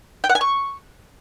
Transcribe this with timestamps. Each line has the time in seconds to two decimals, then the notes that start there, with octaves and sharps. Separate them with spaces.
0.24 G5
0.29 F#5
0.35 G#5
0.41 C#6